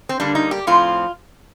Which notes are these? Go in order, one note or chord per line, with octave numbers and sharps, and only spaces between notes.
C4
D3 G3 A#3 D4
D#4
G4
A2 F3 C4 F4